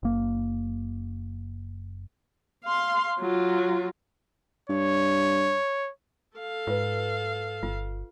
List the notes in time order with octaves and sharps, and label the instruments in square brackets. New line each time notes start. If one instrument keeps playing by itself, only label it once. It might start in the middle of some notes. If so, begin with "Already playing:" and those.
[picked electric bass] F#1 A#3
[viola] F5 C6
F#3 F4
[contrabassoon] G2 [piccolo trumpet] C#5
[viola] A4 F5
[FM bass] G#2 [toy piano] F4 B4
[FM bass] G1 [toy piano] F4